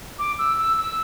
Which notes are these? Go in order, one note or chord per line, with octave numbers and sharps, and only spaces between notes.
D6
E6
E6
E6